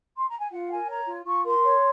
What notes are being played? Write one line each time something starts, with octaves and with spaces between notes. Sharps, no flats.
C6
A#5
G#5
F4 F#5
A#4 G#5
C#5 A#5
F4
F4 C#6
A#4 C6
C#5